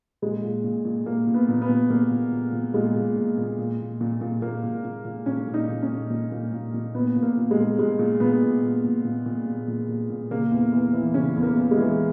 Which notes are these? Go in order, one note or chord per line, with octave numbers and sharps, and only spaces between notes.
A#2 G#3
A#2
A#2
A#2
A#2 A#3
A#2
B3
A#2
B3
A#2
A#2 A#3
A#2
A#2
A#2
A#2 G#3
A#2
A#2
A#2
A#2
A#2
A#2
A#2
A#2 A#3
A#2
A#2
A#2
A#2 C#4
A#2
D#4
A#2
C#4
A#2
A#2
A#2
A#2
A#2
A#2 B3
A#2
A#3
A#2
G#3
A#2
A#2 G#3
A#2
A#2 B3
A#2
A#2
A#2
A#2
A#2
A#2
A#2
A#2
A#2
C#3 A#3
E2
E2
E3
C#3 C#4
E2
A#3
E2
G#3
E3